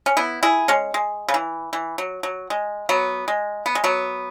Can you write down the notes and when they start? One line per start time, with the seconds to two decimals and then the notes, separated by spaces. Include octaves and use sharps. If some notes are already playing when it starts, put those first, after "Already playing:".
0.06 C#4
0.17 B3 E4
0.43 E4 G#4
0.68 G#3 C#4
0.94 G#3
1.29 C#3
1.34 E3
1.73 E3
1.98 F#3
2.23 F#3
2.50 G#3
2.89 F#3 B3
3.28 G#3
3.66 B3
3.75 G#3
3.84 F#3 B3